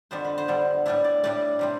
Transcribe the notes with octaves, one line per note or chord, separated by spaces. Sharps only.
F2 D3 G3 B3 C5
B4
C5
F2 D3 G3 B3
A2 G3 D4 E4
D5
A2 G3 D4 D5
C3 G3 C4